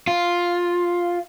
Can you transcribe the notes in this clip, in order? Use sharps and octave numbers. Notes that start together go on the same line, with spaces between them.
F4